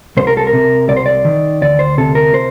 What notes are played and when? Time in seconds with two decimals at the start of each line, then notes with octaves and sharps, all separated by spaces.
0.17 C2 C5
0.27 A#4
0.37 A4
0.47 A#4
0.53 C3
0.89 C2 D5
0.97 C5
1.06 D5
1.25 D#3
1.61 D2 D5
1.79 C5
1.98 C3 A4
2.15 A#4
2.34 C5